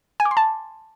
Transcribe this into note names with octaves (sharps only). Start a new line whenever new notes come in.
G#5
D6
C6
A5